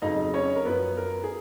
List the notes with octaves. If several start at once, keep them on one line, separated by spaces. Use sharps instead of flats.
F2 C#3 F#3 D#4 D#5
C#4 C#5
A#4
F#2 F3 B3 B4
A#4
G#4